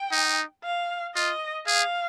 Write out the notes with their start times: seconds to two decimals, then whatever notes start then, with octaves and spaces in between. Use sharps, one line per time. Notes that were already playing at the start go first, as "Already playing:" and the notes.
Already playing: G5
0.12 D#4
0.64 F5
1.15 F4 D#5
1.67 G#4 F5